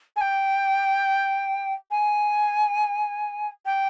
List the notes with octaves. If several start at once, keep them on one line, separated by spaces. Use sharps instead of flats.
G#5
G5
G#5
G5